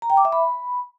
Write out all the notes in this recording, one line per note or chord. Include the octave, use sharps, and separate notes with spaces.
A#5
G5
D6
E5
B5